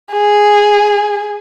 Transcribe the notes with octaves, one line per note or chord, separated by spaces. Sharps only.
G#4